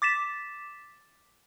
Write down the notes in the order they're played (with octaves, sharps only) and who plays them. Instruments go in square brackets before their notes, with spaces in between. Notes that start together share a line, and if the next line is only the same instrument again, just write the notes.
[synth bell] D6 A6 B6 E7